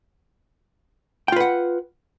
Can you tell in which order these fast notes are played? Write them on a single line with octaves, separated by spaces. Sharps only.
G5 F4 B4 F#5